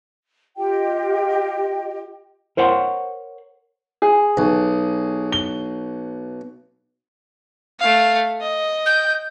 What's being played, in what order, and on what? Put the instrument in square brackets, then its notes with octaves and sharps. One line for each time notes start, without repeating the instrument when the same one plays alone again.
[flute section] F4 G4 D#5 G5
[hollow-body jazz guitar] A#4 C5 C#5 F#5 B5 C6
[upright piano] G#4
[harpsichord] B1
[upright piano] G7
[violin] A3 F5
D#5
[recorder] G6